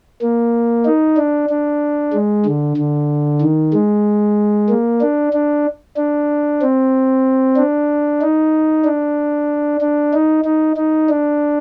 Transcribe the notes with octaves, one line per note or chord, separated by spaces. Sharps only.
A#3
D#4
D4
D4
G#3
D3
D3
D#3
G#3
A#3
D4
D4
D4
C4
D4
D#4
D4
D4
D#4
D#4
D#4
D4